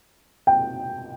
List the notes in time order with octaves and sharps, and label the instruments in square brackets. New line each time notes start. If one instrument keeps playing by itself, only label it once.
[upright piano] G5